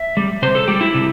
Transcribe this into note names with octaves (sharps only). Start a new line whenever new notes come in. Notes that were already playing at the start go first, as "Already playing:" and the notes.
Already playing: E5
G3
C3 C5
A4
G3 G4
E4
C3